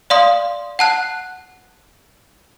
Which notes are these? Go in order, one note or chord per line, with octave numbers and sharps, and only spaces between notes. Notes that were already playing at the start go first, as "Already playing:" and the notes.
D5 F5 C6 D#6
F#5 A5 F#6